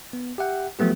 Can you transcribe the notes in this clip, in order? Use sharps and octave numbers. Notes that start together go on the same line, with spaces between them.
B3
G4 E5 F#5 G5
F3 F#3 A3 B3 G4